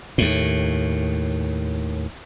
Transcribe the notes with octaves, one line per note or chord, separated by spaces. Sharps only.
D#2 A2